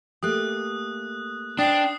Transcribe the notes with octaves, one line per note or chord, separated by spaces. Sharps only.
A3 A#3 G4 D#6 F#6
D4 D#4 B4 C5 G5 D#6 C7